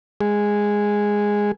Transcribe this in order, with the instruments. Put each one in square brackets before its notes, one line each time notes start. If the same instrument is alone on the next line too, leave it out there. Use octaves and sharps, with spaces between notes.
[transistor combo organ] G#3 G#4